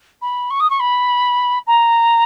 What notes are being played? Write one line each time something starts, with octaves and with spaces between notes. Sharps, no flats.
B5
C#6
D#6
C#6
B5
A#5